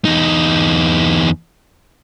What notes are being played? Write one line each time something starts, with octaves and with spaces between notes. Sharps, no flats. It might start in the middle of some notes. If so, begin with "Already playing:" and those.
E2 D#4